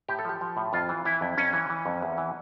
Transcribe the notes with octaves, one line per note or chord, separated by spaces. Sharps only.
A2 G4
A4
F3 G4
F3
A2
F2 F4
E3
E3 E4
F2
F2 C#4
E3
E3
F2
E2
E3